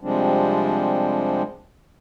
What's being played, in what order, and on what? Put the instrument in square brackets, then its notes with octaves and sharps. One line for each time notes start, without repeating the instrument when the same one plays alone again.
[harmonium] C3 F3 G3 G#3 C4 D4